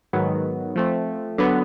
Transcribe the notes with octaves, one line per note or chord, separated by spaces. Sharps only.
G#2 D#3 F#3 B3
F3 A3 C4
D3 F#3 B3